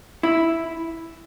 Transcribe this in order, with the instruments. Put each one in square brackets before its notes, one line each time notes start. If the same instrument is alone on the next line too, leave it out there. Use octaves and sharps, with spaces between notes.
[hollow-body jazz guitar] E4